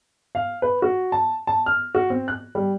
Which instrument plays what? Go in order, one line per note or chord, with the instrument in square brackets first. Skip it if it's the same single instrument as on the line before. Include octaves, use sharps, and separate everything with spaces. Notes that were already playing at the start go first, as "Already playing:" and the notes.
[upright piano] F5
B4
F#4
A5
A5
F6
F#4
C4
F#6
G3